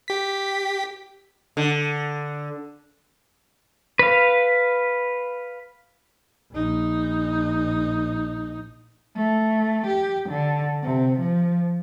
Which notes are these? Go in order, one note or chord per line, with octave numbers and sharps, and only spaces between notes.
G4 B6
D3
B4 F5
A#1 D#4
A3
G4
D3
C3
F3